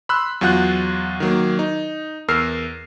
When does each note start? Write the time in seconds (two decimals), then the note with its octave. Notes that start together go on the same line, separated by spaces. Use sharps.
0.09 B5 C6 E6 F#6
0.41 E2 F#3 F4 F#5 F#6 G6
1.20 D#3 F#3 A#3
1.59 D#4
2.28 E2 A#4 E6 F6 C7